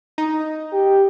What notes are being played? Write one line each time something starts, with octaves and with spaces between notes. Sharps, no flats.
D#4
G4